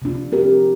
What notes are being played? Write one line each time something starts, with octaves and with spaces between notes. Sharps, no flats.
C3 F3 D4 F4
F3 C4 G4 A#4